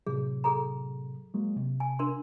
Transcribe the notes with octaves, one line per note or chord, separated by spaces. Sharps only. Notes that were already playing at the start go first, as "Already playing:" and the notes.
A2 C3 F#3 G#4
G#4 A4 A#5
F#3 G#3 A#3
C3
G#5
D4 A#4 C6